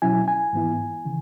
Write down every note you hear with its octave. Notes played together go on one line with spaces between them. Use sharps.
B2 F#3 C#4 E4 G#5
G#5
G#2 E3 B3 E4
C#3 E3